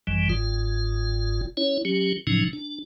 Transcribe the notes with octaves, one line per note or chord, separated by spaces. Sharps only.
G#1 F#2 E3 G3
G1 G#2 F4
C#4 E4 C#5
F#3 C#4 G4
A2 C#3 F3 F#3 C#4 D#4
D4